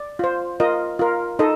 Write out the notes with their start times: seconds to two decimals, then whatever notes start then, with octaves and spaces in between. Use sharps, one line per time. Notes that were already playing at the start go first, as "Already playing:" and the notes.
Already playing: D5
0.19 F4 C5
0.60 F4 A#4 D#5
0.99 F4 A#4
1.39 D#4 A4 D#5